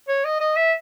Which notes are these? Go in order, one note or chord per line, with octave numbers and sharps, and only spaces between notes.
C#5
D#5
D#5
E5